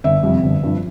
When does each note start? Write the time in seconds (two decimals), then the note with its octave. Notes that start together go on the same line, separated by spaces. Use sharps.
0.04 G1 E5
0.23 F2 C3 G3
0.44 G1
0.63 G2 F3